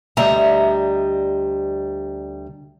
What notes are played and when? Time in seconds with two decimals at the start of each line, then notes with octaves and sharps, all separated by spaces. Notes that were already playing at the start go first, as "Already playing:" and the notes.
0.17 D2 G3 D#5 E5 A#5